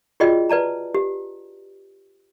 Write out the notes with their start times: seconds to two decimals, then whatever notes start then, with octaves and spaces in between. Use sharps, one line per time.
0.20 F4 F#4 G#4 D5 D#5 G5
0.50 B4 D5 A5 A#5
0.94 G4